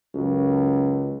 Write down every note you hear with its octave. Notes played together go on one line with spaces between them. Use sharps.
C#2 F#2